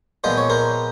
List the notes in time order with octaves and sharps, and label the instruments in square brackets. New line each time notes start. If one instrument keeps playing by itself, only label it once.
[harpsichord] A#2 F3 G#3 B3 C5
C#5
A#4 C5